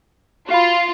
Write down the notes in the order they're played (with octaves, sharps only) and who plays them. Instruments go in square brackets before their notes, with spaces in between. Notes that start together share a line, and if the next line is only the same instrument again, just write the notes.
[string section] F4 [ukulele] F#4 F5 B5